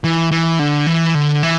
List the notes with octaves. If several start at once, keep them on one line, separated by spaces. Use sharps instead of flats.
E3
E3
D3
E3
D3
E3